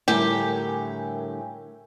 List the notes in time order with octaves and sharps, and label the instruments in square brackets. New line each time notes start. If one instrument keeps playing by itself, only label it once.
[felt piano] A2 [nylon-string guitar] D3 G3 A3 [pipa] G4 [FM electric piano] A#4 G5 G#5